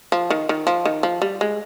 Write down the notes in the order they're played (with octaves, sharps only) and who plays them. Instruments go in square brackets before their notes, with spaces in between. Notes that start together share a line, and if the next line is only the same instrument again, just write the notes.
[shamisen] F3
D#3
D#3
F3
D#3
F3
G3
G#3